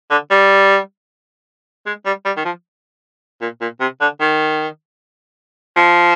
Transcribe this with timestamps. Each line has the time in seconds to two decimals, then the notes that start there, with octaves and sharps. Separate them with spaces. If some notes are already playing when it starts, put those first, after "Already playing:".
0.11 D3
0.31 G3
1.86 G#3
2.06 G3
2.26 G3
2.37 D#3
2.45 F3
3.42 A#2
3.61 A#2
3.81 C3
4.01 D3
4.21 D#3
5.76 F3